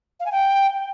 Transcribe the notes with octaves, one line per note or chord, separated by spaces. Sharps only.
F5
G#5
G5